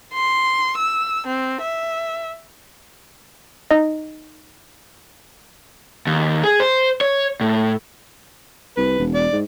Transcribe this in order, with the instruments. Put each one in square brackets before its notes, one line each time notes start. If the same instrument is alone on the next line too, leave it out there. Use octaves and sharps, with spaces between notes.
[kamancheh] C6
E6
C4
E5
[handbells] D#4 D#5
[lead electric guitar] D#2
G#4
C5
C#5
A2
[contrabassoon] C2 [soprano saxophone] B4
[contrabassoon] E1
[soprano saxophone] D5
[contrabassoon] G#2